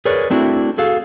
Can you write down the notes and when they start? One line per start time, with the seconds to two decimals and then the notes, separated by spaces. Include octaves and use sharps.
0.05 G#4 A#4 B4 C#5 D5
0.30 A3 C4 D4 E4 F#4
0.78 F#4 G#4 A4 F5